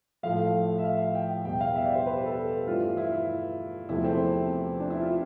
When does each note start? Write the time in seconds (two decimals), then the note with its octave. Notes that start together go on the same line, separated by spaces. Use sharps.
0.23 A2 F3 A3 F5
0.78 E5
0.84 F5
1.15 G5
1.45 E2 B2 G3 G5
1.61 F5
1.76 E5
1.86 D5
1.95 C5
2.06 B4
2.16 G4
2.26 A4
2.67 G2 E3 A3 F4
2.97 E4
3.89 E2 C3 F3 A3 E4
4.04 C4
4.80 D4
4.90 E4
5.01 F4